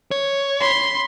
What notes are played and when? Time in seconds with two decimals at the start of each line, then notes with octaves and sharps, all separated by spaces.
0.11 C#5
0.60 B5 C6